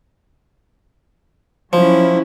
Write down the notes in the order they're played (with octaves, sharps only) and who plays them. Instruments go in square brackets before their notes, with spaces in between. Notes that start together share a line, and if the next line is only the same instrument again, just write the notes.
[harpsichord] F3 [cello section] F#3 C#4 E4